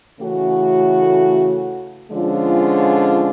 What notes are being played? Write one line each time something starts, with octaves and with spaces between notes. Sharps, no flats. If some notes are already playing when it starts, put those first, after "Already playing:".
C#3 E3 A3 C#4 F#4
D3 F3 G#3 C#4 F4